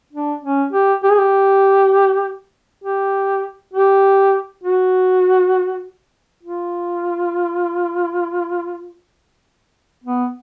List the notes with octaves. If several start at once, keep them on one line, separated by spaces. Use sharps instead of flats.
D4
C#4
G4
G4
G#4
G4
G4
G4
F#4
F4
B3